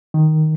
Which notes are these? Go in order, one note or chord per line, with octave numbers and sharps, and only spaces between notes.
D#3